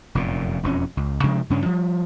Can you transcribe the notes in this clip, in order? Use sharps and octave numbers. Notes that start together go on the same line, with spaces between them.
F1 F#2 A#2
E1 F2 E3 C#4
C#2
C3 F3 G#3 D4
G2 C#3 C#4 D4
F3 G3